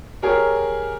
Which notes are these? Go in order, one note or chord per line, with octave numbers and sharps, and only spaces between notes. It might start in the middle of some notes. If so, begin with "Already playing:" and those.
G4 G#4 A#4 C#5